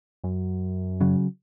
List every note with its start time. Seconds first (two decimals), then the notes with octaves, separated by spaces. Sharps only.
0.24 F#2
1.01 C#3 F#3